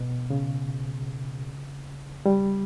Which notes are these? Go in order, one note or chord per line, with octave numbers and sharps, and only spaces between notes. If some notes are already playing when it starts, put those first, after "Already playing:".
Already playing: B2
C#3
G3